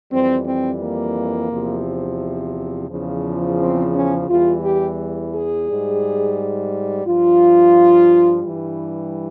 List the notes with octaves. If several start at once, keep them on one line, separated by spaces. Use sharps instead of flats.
F2 E3 G3 C4
C4
A#3
E2 C3 F3
E2 C#3 F3
C4
C#4
E2 E3 G3 F4
G4
G#4
G#2 G3
G2 F3 F4
G2 E3 G3